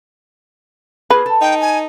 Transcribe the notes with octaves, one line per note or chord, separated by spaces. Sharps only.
A#3 F4 G#4 B4
A4
D#4 G5
G#5